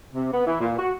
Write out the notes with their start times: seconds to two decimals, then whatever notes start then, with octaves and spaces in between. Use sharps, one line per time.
0.14 C3
0.32 B3
0.46 E3
0.60 A#2
0.77 F#4